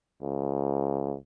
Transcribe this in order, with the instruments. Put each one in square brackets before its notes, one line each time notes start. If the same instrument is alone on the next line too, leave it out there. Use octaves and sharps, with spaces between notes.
[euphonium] C#2